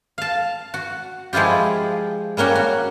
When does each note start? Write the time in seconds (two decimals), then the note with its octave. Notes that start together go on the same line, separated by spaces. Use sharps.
0.18 F5 A5
0.74 F#4
1.33 F3 G#3 E4 F4 G4
2.37 G3 A#3 C#4 F#4
2.55 F#4